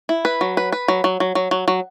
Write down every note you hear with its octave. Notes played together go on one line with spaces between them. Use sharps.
E4
B4
F#3
B4
B4
F#3
F#3
F#3
F#3
F#3
F#3